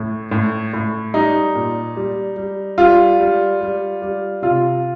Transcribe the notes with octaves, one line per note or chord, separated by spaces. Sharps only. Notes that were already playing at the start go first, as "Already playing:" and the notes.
Already playing: A2
A2
A2
G3 D#4
A#2
G3
G3
G3 F4
G3
G3
G3
C3 F4